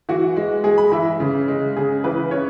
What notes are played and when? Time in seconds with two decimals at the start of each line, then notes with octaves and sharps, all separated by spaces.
0.09 E3 F#4
0.36 G#3
0.64 G#3 G#4
0.78 B5
0.92 E3 E5
1.20 C#3
1.48 G#3
1.76 C#3 G#4
2.04 E3 B4
2.31 C#4 C#5